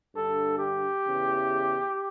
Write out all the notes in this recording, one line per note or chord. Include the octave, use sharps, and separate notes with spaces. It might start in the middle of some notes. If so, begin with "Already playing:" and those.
G2 D3 A4
G4
E2 C#3 E3